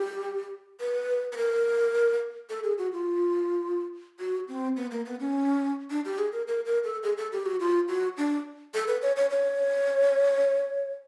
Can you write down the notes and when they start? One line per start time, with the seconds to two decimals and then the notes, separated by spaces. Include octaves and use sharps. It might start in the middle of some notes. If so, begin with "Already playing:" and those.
Already playing: G4
0.80 B4
1.32 B4
1.37 A#4
2.50 A4
2.64 G#4
2.78 F#4
2.92 F4
4.20 F#4
4.48 C4
4.77 B3
4.91 A#3
5.06 B3
5.20 C#4
5.91 D4
6.05 G4
6.18 G#4
6.32 A#4
6.47 A#4
6.66 A#4
6.84 A4
7.03 G#4
7.17 A4
7.33 G4
7.46 F#4
7.60 F4
7.88 F#4
8.17 D4
8.74 A4
8.88 B4
9.02 C#5
9.16 C#5
9.30 C#5